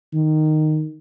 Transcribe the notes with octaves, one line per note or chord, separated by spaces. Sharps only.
D#3